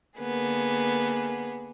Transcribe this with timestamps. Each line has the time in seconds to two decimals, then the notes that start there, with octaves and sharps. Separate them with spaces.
0.19 D3 A#3 B3 G#4